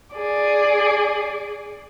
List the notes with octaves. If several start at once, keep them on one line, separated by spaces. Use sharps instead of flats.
G#4 D5